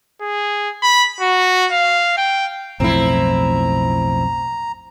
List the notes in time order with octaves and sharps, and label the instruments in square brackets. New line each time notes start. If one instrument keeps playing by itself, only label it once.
[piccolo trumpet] G#4
B5
F#4
F5
G5
[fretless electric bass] B1 F2 A2 [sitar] C4 E4 [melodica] A#5